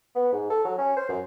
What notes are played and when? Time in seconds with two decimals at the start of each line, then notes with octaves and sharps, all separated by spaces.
0.16 B3
0.32 G#2
0.50 A4
0.65 F#3
0.78 C#4
0.97 C5
1.09 F#2